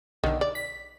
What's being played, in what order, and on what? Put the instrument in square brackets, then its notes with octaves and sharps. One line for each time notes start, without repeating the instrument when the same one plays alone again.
[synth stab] B1 D3 [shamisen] D#3
[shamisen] D5
[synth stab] B6